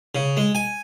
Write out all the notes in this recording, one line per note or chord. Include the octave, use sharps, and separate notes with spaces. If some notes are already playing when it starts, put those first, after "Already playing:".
C#3
G#3
G#5